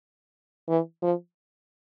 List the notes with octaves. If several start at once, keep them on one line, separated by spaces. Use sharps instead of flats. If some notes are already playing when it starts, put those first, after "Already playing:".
E3
F3